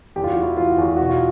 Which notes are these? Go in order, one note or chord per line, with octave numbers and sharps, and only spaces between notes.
E2 G4
F4
F#4
E3
E4
E3 F4
F#4
E2
F4
B2 F#4
F4